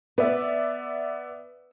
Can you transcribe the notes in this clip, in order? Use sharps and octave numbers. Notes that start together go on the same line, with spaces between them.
B3 B4 D5 E5